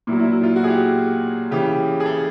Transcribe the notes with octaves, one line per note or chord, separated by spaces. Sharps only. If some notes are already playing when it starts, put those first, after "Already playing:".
A#2 F#3 E4
E4
E4
F4
F#4
G#4
G4
C#3 E3 G4
G#4
A4